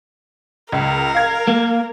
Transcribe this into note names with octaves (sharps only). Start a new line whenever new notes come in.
C#2 A#4
F5 G#6
A#3